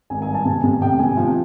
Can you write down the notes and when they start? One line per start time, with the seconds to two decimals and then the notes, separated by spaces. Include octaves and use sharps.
0.10 G#1 G#5
0.22 G#5
0.28 G2
0.34 A5
0.45 C3 G#5
0.64 C3
0.81 F1 G5
0.99 C3 G#5
1.17 F3